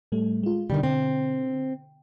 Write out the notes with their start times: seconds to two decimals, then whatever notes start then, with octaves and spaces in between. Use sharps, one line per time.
0.12 A2 G3 A3
0.43 G#3 F4
0.70 B2 D3 D#3 G3
0.83 C4